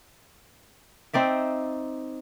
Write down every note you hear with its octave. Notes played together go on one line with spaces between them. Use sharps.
C4 D#4 D5 E5